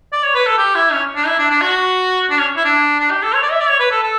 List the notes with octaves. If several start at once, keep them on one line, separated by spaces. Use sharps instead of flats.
D5
C#5
B4
A4
G4
E4
C#4
D4
E4
D4
D4
F#4
D4
C#4
E4
D4
D4
G4
A4
C#5
D5
E5
D5
C#5
B4
A4
A4